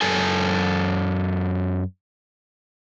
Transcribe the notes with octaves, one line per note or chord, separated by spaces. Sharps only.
F#2 A4 G#5